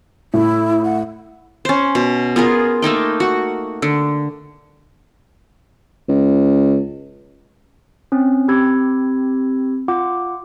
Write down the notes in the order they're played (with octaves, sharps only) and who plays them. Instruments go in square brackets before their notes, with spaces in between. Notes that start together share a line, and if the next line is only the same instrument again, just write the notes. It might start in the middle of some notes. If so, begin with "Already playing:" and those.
[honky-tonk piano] A2 [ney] E4
[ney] F#5
[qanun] C#4 C5
B2
B3 F4 G#4 A#4
A3 A#3 D#4 G5
F#4
D3
[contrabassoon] C#2
[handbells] C4 C#4
C4 G4 B5 E6 G#6
F4 F#5 D6